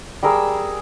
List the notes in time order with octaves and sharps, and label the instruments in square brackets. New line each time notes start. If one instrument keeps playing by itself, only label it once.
[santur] G3 G#4 A#4 E6